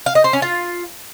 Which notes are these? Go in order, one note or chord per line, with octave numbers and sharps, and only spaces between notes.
F5
D#5
C5
C#4
F4